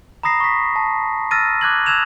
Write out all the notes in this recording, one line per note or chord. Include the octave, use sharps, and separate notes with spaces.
A#5 B5 D#6 A#6 C7
C#6 B6
A5
E6 F6 A6 A#6 D#7
D6 F#6 G#6 F#7
E6 F#6 G#6 E7 F7